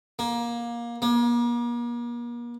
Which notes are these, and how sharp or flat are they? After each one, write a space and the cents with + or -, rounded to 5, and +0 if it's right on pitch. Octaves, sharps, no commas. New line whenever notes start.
A#3 +20
A#3 +40